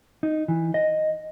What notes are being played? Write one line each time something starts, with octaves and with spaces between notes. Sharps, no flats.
D#4
E3
D#5